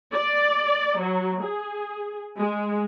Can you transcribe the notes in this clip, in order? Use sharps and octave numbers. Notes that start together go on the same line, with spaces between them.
D5
F#3
G#4
G#3